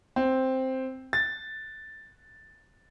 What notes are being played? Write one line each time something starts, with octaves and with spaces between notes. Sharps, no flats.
C4
A6